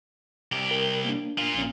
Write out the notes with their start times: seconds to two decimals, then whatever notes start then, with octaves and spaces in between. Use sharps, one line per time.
0.52 C2 G4
0.71 A#4
1.05 A#3 D4
1.38 A#2 F4
1.55 A#1 C#4